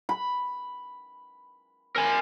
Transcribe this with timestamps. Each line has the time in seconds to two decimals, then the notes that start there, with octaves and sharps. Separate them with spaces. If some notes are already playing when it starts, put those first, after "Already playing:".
0.09 B5
1.96 A#4 G#5